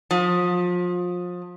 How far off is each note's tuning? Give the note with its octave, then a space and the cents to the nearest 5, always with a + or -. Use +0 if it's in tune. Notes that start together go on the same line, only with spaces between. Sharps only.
F3 +30